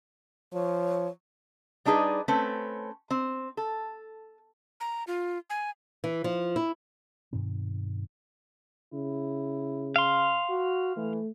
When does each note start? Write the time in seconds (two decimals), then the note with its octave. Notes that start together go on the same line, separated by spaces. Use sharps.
0.53 F3 C#5
1.85 G3 D4 D#4 G#4 B4
2.28 A3 C4 C#4 B4
3.11 C4
3.57 A4
4.80 A#5
5.07 F4
5.50 G#5
6.04 E3
6.24 F3
6.56 E4
7.33 G2 B2 D#3 C4
8.93 C#3 E4
9.96 F5 C6
10.49 F#4
10.96 E3 A3